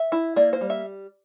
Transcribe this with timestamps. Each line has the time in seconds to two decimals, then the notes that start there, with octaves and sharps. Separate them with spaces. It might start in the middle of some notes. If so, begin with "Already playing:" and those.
Already playing: E5
0.12 E4
0.36 A#3 D5
0.53 C5
0.61 G3
0.70 E5